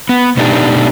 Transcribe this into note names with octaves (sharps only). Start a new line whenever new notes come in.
B3
B2 A3 B3 D4 D#4 G4